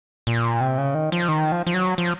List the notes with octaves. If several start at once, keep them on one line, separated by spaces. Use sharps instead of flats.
A#2
C3
C#3
D#3
F3
D#3
F3
F3
F#3
F3